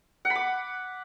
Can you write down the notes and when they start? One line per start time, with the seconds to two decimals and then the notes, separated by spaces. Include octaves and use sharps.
0.25 F#5
0.30 B5
0.35 D6